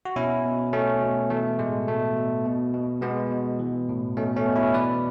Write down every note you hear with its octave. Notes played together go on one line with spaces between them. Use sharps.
F#4
B2 C#4 E4
B2
B2 A3 C#4
B2
E3 A3
A2 G#3
B2 A3
B2
B2
B2
B2 G#3 B3
B2
E3
A2
B2 A3 C#4
A3 C#4
B2
C#4 E4
E3 B4 D5